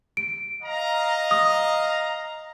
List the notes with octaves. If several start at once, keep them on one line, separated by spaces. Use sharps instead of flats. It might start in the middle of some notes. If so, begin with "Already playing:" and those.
D7
D#5 F5 A#5
D#6